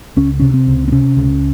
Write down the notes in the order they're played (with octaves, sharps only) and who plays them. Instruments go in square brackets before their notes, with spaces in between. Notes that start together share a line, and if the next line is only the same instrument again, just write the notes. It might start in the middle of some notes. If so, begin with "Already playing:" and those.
[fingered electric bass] C#2 C#4
C3 C#4
C4
C#2
C4
C3 C#4
C#2